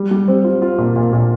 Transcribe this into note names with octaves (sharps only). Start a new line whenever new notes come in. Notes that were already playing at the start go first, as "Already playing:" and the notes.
Already playing: G3
G3
C4
F4
F4
A#2
A#2
A#2